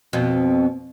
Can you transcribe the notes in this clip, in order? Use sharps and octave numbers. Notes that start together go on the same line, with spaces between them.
F2 B2